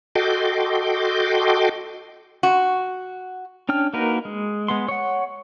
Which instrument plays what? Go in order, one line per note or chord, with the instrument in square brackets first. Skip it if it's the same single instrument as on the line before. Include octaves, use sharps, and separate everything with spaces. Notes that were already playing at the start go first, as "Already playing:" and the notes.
[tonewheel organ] F#4 A4 D#5 G5 C6 D6
[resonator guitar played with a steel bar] F#4
[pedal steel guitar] C#4 D4 G5 F6
A#3 D#4 F#4 A#4 B4
G#3
G#3 B3 C6
C#5 F#5